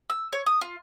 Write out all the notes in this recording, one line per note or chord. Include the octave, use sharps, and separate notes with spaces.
E6
C#5
D#6
F4